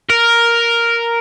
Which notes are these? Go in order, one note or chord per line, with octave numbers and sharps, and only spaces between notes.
A#4